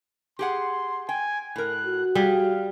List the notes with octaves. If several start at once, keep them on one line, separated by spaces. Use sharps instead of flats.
G4 G#4 F#5 C6
G5 G#5
A2 A#4 F#6
F#4
G3 G#4 F5